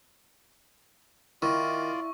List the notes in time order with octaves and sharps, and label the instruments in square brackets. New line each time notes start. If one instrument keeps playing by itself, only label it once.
[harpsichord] D#3 [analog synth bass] E4 [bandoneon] F4 D5 [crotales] C#6